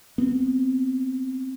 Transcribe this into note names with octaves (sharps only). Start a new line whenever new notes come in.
B3 C4